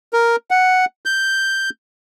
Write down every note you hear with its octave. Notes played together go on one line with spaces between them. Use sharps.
A#4
F#5
G6